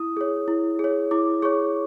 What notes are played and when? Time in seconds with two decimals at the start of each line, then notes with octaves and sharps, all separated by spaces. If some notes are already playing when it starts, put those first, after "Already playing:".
Already playing: E4 D#6
0.17 G#4 C#5
0.48 E4
0.79 G#4
0.84 C#5
1.11 E4 D6
1.42 G#4 C#5 C#6